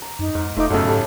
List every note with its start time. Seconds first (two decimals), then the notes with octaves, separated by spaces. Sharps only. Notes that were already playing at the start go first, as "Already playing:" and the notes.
0.02 A#5 D6
0.19 F#2 D#4
0.35 F2 G#2 D#5
0.57 E1 A3 D#4 F4 C5 E5 D6
0.70 B1 F#2 C#3 A3 F#4 C#5 D#5
0.85 G#2 E4 G4 A4